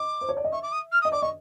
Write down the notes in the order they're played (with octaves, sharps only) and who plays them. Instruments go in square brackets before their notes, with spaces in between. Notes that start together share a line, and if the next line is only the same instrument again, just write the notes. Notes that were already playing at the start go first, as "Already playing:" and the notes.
Already playing: [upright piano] D#5 [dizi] D6
[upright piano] C5
C#5
D5
D#5
[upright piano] E5 [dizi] C#6
[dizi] D6
D#6
F6
D#6
[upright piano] D#5
[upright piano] D5 [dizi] D6
[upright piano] D#5 [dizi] C#6